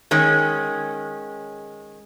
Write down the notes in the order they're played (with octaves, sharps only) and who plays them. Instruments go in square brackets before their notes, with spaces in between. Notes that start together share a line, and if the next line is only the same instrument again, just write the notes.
[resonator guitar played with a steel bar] D#3 G#3 C#4